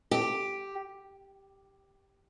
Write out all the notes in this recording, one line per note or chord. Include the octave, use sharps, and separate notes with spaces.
G4